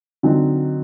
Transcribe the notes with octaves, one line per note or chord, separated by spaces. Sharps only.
D3 F#3 C4 D#4